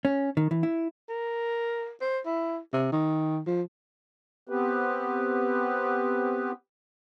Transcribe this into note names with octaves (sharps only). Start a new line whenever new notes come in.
C#4
D#3
E3
E4
A#4
C5
E4
C3
D#3
F3
B3 C4 G4 B4